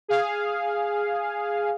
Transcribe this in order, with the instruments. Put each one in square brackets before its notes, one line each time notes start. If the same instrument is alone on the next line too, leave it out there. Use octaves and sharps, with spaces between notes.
[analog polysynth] G#4 F5